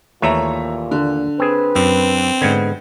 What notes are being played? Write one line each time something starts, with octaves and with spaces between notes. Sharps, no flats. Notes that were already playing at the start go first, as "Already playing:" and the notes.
D#2 A#2 E3 A3 C#5 E5 A#5
D3
C4 G#4 B4
F#2 C4
G#2 D3 B3 G#6